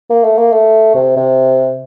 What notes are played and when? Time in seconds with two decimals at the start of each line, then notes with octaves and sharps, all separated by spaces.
0.10 A#3
0.24 A3
0.38 A#3
0.52 A3
0.95 C3
1.17 C3